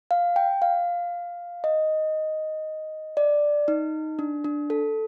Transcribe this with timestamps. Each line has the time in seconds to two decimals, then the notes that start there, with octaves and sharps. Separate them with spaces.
0.11 F5
0.36 G5
0.62 F5
1.64 D#5
3.17 D5
3.68 D#4
4.19 D4
4.44 D4
4.70 A4